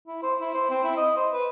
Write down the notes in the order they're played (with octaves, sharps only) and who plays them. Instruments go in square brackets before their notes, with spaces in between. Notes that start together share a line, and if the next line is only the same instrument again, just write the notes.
[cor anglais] E4
C5
E4
C5
C4
E4
D#5
C5
B4